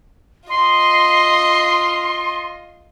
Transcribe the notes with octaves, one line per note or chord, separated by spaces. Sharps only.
F4 D#5 C6